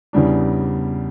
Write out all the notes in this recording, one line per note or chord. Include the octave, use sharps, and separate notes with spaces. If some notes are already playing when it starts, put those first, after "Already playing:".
E2 C#3 G3 D4